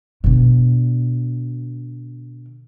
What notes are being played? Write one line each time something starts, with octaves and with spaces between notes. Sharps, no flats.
B2 D3